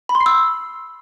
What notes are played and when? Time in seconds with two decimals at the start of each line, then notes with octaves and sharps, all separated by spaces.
0.09 B5
0.15 C6
0.20 C7
0.26 E6